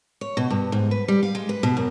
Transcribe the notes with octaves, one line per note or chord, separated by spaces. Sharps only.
C#5
B2
G2
G#2
B4
G3
F5
G#3
B4
B2
F#2